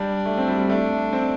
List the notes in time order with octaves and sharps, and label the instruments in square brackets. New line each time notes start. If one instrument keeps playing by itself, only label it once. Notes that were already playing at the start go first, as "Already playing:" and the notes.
Already playing: [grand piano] G3 [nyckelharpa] D4
[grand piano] A3
C4
G3
G3
[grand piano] A3 [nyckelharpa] D4
[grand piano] C4